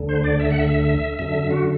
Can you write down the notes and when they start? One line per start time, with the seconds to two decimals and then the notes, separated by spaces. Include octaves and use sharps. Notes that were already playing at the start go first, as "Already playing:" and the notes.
Already playing: D2 D3
0.09 C5
0.24 D5
0.40 E5
0.50 F#5
0.59 E5
1.19 F#2 D3 E5
1.50 F#4